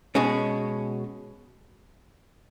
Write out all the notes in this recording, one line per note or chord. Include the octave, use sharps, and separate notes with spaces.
B2 G#3 C#4